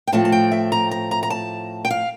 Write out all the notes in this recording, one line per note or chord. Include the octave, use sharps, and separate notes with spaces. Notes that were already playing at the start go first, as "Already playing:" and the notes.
G5
A2 F3 A3 C4 A5
A5
G5
E5
A#5
A#5
A#5
A#5
A5
G5
F5